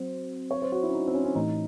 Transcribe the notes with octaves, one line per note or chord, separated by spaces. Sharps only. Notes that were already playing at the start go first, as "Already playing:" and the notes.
Already playing: F#3 C4 F#4 C5
C#5
C5
F#4
E4
C#4
D#4
C4
C#4
C#4
A2 E3 A3 D#4